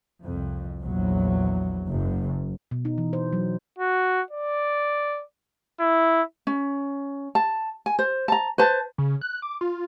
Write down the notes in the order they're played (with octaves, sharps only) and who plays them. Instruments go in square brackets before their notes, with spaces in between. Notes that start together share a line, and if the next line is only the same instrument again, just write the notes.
[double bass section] C2 F2
A#1 E2 F#3
F#1 F#2
[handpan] B2
D#4
E3
C5
F#3
[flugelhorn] F#4
D5
E4
[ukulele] C#4
A5
G#5
C5
A5 A#5
B4 C5 A5
[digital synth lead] C#3
F#6
D6
F4